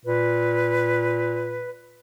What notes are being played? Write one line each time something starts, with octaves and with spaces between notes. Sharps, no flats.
A#2 B4